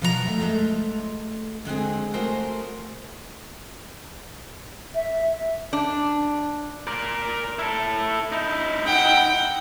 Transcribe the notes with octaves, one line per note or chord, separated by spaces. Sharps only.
B2 F3 F#3 B3 G#4 A#5
A3 E5
G#3 A3 F4 A4
D3 G#3 C4 G#4
A3 F#4 G#4 A#4 C5
E5
D4
A#4 D5
E4 A4
D#4 E4
F#5 G5